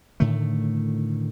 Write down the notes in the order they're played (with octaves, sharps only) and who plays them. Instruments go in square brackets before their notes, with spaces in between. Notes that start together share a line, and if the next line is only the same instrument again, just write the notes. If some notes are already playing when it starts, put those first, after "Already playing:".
[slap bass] A2 D3 D#3 A3